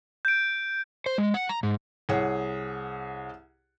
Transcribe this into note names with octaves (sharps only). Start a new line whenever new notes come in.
G6 D7
C5
G#3
F#5
A#5
G#2
C2 G#4 C#5 F#5